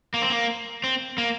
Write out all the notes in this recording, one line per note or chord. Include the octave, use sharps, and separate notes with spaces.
A#3
C4
A#3
C4
A#3